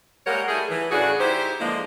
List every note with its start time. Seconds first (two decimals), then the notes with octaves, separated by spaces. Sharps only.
0.27 G3 G#3 A#3 A#4 C#5 F#5
0.48 G3 A3 E4 G#4
0.69 E3
0.91 A2 C#3 D4 F#4 G#4
1.20 D#4 E4 G4 C5
1.59 D3 E3 F3 G#3 A#3